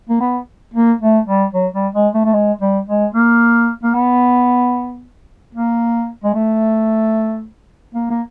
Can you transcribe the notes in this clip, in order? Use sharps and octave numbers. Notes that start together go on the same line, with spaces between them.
A#3
B3
A#3
A3
G3
F#3
G3
G#3
A3
A3
G#3
G3
G#3
A#3
A#3
B3
A#3
G#3
A3
A#3
A#3